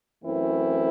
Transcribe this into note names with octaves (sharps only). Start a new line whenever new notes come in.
F#2 E3 A3 C4 E4